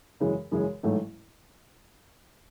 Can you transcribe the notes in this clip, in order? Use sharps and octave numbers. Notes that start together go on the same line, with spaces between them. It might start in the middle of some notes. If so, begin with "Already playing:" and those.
F#2 C#3 E3 G#3
F#2 C#3 E3 G#3
A1 G#2 F#3 A3